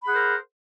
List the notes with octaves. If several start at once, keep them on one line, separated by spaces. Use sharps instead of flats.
G#4 A#4 C5 F#5 B5